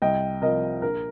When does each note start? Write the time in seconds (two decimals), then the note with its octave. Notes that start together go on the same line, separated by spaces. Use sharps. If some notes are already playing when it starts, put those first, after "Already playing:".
0.02 C2 D#5 G5
0.42 C3 F3 A#4 D#5
0.82 A#1 A#4